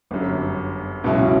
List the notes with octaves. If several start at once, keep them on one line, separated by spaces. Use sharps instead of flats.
G1 F#2 D3
C#2 B2 F#3 C#4 E4